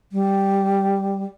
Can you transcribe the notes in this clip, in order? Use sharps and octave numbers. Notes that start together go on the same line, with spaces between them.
G3